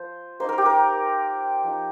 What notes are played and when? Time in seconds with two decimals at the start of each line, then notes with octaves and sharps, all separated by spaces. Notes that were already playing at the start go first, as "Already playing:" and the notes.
Already playing: F3 F4 C5
0.40 A#3 D#4 C5
0.49 A#4
0.58 G4
0.66 A#4
1.63 F3 D#4